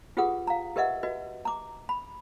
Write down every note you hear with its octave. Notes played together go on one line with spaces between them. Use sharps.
F4 G4 G#4 B4 F#5 D#6
F5 A#5
G4 A#4 B4 D#5 E5 F#5
F#4 B4 D#5
A#5 D6
B5